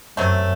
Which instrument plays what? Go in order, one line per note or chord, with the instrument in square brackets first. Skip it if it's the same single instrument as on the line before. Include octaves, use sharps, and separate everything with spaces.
[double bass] F#2 [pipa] C3 F#3 A3